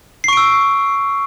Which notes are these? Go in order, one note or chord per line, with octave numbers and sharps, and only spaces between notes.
C#6 E6 C7 D7